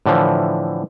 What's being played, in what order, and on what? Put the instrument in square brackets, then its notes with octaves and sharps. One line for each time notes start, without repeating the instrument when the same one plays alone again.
[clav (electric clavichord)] A2 D3 E3 F3